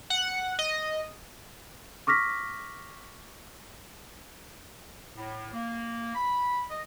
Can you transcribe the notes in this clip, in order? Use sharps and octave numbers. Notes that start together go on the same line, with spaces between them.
F#5
D#5
C#6 D6 F6 A#6 B6
A2
A#3
B5
D#5